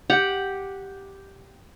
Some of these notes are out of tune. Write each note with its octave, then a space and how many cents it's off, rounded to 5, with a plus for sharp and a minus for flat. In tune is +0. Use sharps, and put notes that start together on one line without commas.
G4 +0 F#5 +0